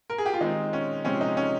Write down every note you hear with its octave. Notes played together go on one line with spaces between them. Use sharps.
A#4
G#4
G4
F4
D#3 G#3 C4 D#4
C#4
C3 F3 G#3 C4 C#4
D#4
C#4